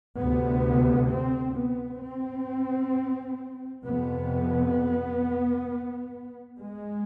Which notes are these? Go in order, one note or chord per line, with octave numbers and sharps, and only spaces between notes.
D2 C3 B3
C4
B3
C4
F2 C3 B3
G#3